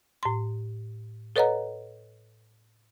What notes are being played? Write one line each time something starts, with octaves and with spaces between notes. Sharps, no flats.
A2 C6
A4 B4 C#5 D#5 F#5 A#5